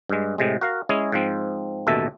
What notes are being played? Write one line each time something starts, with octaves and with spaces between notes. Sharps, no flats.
G2 G#3
A2 C3 G#3
F#4 A#4 F5
G#3 C#4 E4 G#4
G#2 F3 C4
A1 D#2 B2 A4 E5